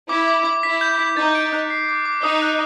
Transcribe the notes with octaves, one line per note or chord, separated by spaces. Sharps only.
E4 D6
D6
D6
E4 B6
G6
B6
D#4 A6
D7
F#6
C7
D6
D6
D#4 D#6
F#6